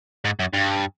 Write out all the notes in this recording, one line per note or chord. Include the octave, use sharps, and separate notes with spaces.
G#2
F#2
G2